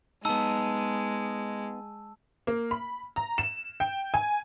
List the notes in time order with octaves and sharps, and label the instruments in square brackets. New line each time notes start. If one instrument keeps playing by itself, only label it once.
[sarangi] G#3 [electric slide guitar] B3 D#4 [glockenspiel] A5 E6
[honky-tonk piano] A#3
B5
A#5
E7
G5
G#5